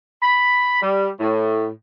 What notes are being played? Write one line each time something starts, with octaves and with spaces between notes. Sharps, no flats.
B5
G3
A2